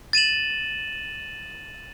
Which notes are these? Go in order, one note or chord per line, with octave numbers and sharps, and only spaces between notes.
A6 D#7 E7 F#7